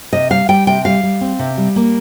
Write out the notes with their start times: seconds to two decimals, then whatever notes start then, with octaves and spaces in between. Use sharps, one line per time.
0.13 C3 D#5
0.31 G3 F5
0.49 G3 G5
0.67 C3 G5
0.85 G3 F5
1.03 G3
1.21 C4
1.39 C3
1.57 G3
1.76 A#3